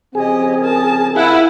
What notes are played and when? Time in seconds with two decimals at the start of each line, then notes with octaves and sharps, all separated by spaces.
0.15 C#3 F3 C4 G4 G#4 D#5
0.60 A#4 A5
1.16 E4 F5 F#5 G#5